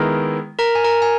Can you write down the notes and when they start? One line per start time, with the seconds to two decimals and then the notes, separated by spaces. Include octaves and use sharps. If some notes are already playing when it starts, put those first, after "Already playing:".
Already playing: D#3 G#3 B3 E4 A#4
0.59 A#4 A#5
0.75 G#5
0.84 A#4 A#5
1.02 G#5